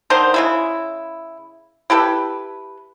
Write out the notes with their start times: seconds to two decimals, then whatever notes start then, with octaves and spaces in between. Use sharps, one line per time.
0.10 D3 D#3 D#4 C5
0.34 C#3 G#3 E4
1.90 E4 G4 A4 B4